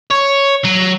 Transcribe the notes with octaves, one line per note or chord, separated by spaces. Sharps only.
C#5
F#3